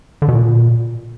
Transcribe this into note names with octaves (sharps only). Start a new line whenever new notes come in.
D3
B2
A#2